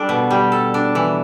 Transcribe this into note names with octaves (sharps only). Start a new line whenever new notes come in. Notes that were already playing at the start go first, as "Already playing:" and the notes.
Already playing: G3 D4 A4
B2
G3
A4
D4
E3